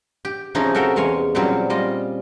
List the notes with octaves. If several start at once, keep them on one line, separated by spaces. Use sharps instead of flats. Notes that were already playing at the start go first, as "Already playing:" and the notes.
G4
C3 F3 C#4 D#4 E4 G#4
F#4 A4 A#4 E5 F5 G5
E2 G#3 C#5 F5 G#5
A#2 F#3 G3 C4 C#4 F4
G3 F4 D#5